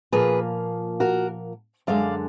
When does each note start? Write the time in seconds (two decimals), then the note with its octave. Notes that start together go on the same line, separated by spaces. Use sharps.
0.12 A#2 F3 A#3 G#4 B4
1.00 F#4 A#4
1.87 F#2 D3 G#3 D5 F5